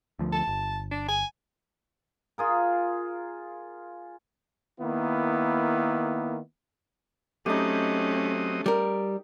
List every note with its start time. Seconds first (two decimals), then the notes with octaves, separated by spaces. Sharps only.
0.19 D2 F3
0.33 A5
0.48 G1
0.91 D4
1.09 G#5
2.38 F4 G#4 A#4
4.80 D#3 A#3 B3 E4
7.46 F#3 A3 C4 C#4 D#4 G4 D#5
8.66 G3 A#4